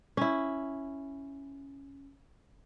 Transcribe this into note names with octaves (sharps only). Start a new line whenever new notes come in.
C#4 E4